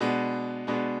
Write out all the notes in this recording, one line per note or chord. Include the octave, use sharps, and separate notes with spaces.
B2 G#3 B3 D4
B2 G#3 B3 D4